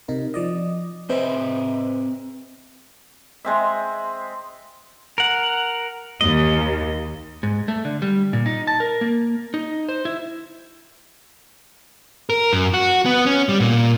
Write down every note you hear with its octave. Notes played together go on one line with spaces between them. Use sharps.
C3 D#4 A#4
F3 D5 D#5
C4 G#4 B4 C5 D#5 E5
G#3 C4 E5
A#4 F#5
D#2 D#5
G#2
A3
D3
G3
A#2
D#4
A5
A#4
A#3
D#4
C5
E4
A#4
F#2
F#4
B3
C#4
G3
A#2